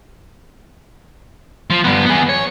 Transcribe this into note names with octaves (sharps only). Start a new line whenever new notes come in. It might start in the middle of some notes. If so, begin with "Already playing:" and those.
F3
G2 B3
B3 G#4
C#5